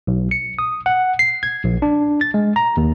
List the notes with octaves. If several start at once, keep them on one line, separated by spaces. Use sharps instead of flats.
B1
C#7
D#6
F#5
C7
G#6
A#1
D4
A6
G#3
A#5
D#2